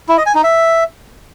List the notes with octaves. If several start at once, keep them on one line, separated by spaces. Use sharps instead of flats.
E4
D#5
G#5
D#4
E5